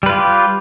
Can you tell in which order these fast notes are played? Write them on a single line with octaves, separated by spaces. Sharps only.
G3 B4 F4 G4